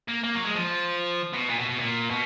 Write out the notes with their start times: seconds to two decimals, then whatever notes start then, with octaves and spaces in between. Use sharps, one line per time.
0.08 A#3
0.24 A#3
0.35 F#3
0.45 G#3
0.55 F3
1.33 B2
1.49 A#2
1.59 B2
1.70 B2
1.80 A#2
2.11 B2